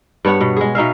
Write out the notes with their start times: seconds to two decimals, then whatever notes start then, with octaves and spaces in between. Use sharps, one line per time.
0.25 G2 B3 C#5 F#5
0.41 B2
0.57 G#3 G#4
0.75 B2 D#4 E5 F5